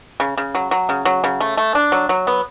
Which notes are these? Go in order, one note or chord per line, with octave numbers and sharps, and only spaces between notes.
C#3
C#3
F#3
F#3
C#3
F#3
C#3
A3
A3
D4
F#3
F#3
B3